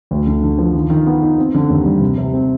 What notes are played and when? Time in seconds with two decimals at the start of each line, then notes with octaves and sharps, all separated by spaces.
0.11 D2
0.27 D3
0.43 D3
0.58 F3
0.74 D#3
0.90 D#3
1.07 B3
1.22 D#4
1.38 C4
1.54 D3
1.70 D#2
1.86 G3
2.01 C3
2.18 C3
2.34 C4